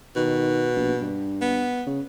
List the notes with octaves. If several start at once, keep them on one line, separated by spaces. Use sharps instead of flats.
B2 D#3
A#1
G2
B3
C#3